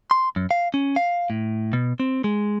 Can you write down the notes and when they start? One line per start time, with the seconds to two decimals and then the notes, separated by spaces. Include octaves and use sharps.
0.11 C6
0.36 F#2
0.51 F5
0.74 C#4
0.96 F5
1.30 A2
1.73 B2
2.00 C4
2.24 G#3